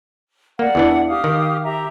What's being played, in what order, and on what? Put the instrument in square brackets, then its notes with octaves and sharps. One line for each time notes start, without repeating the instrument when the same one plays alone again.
[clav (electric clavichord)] A#3 [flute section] D5 F#5
[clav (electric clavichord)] E2 E3 D4
[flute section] G4 F5 D#6
[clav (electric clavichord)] D#3
[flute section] G4 E5 A#5